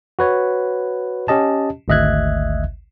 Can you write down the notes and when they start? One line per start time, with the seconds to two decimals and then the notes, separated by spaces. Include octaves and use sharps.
0.19 F#4 B4 C#5
1.28 C#4 G4 D#5 A5
1.88 G#1 D2 D#5 E5 F#6 G#6